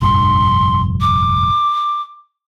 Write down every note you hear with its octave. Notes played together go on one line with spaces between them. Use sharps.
F1 A#1 G2 C6
D6